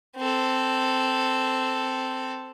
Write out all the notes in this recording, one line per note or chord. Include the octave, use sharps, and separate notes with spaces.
C4 A4